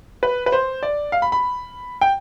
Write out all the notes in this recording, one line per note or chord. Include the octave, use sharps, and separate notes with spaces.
B4
B4
C5
D5
F5
B5
B5
G5